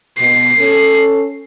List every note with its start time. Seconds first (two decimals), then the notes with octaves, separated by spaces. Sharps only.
0.19 B2 C7
0.59 C#4 A4